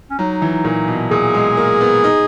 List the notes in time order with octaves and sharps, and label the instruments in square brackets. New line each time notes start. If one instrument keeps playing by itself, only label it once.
[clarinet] C#4
[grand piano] F#3 [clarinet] D#4
[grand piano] E3
A#2
B2
[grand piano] A#2 [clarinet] G#4
[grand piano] G#3
A#3
B3
D#4